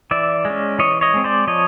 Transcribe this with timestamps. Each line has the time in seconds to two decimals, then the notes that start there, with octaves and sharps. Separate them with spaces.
0.11 E3 D5 E5
0.45 G#3
0.50 C#4
0.79 E3 C#5 D#5
1.01 C#5 D#5
1.14 G#3 C4
1.24 C5 D5
1.48 F3 C#5 D#5